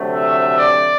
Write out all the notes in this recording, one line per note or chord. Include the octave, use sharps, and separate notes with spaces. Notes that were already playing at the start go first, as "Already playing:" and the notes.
Already playing: D2 C3 F#3 A3
E5
D5